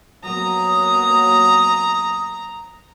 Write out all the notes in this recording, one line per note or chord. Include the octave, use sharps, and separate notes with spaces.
F#3 A#3 B3 A#5 D#6